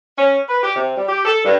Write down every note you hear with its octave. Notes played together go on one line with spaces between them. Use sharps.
C#4
B4
G4
C3
G3
G4
A4
G2